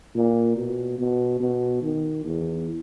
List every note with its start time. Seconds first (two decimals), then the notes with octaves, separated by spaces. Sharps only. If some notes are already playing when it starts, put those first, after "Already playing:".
0.15 A#2
0.56 B2
0.99 B2
1.40 B2
1.82 D#3
2.25 E2